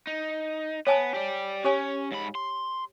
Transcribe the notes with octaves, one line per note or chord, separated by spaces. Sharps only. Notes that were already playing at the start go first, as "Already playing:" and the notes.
D#4
B3 C#5 G#5 A5
G4 D5
C#4 G4 C#5 G#5
G#2 B5
C6